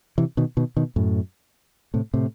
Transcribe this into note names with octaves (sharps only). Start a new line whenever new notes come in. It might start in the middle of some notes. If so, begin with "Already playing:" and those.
C3 E3
B2 D#3
B2 D#3
B2 D#3
F#2 A2
A2 C3
A2 C3